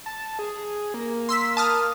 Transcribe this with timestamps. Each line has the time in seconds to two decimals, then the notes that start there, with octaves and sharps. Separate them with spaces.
0.06 A5
0.39 G#4
0.94 A#3
1.29 C6 E6 B6
1.57 A5 D#6 F6